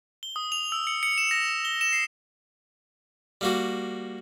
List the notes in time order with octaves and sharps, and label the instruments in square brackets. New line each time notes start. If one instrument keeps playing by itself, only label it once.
[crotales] G7
D#6
F7
E6
C#7
C#7
E7
A#6
E7
G7
E7
C7
[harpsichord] G3 A#3 F#4